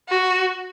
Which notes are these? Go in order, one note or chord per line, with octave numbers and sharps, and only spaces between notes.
F#4